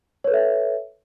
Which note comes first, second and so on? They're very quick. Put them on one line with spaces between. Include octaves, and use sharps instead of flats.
C#5 B4 A4 E5